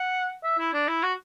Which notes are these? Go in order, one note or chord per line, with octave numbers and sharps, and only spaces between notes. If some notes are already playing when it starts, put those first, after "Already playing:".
Already playing: F#5
E5
E4
D4
E4
F#4